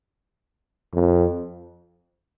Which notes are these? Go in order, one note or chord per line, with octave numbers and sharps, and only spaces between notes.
F2